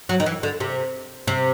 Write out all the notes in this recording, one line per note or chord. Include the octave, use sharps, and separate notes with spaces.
F#3
D#3
E3
D3
C3
C3